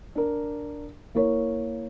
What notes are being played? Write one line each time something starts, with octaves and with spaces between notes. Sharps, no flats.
D4 A#4
A#3 E4 A#4 C#5